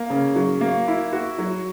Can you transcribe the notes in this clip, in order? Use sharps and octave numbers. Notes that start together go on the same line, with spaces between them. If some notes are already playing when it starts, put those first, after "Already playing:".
Already playing: A#3
C#3
F#3
A#3
E4
F#4
F#3